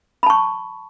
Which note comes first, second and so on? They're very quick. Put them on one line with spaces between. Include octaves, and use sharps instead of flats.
B5 A5 C#6